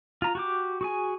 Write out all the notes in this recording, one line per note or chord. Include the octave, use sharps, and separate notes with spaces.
F4 A#5
F#4 G4 D6
F#4 G#4 G#5